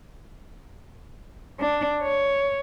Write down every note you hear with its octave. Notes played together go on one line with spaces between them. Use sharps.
D4
C#5